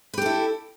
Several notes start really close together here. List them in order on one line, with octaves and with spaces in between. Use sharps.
B4 G4 A4 E4